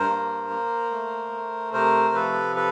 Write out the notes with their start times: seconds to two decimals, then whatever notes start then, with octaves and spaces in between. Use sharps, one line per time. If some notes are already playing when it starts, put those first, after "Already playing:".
Already playing: G2 A#4 C5
0.09 A#3
0.50 A#3
0.91 A3
1.32 A3
1.73 C3 A#4 C5
2.14 F3 A4 B4
2.56 A4 B4